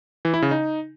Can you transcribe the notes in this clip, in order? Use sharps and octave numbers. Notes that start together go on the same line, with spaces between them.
E3
E4
C#3
D#4